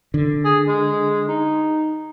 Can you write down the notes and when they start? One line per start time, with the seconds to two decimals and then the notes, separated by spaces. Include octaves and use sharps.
0.14 D3
0.45 G#4
0.67 G#3
1.28 D#4